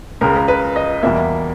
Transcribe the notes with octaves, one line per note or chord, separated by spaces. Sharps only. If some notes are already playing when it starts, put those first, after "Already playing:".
C#2 C#3 G#3 A#4
A#4
B4
D#5
E2 B2 G3 A#3 E5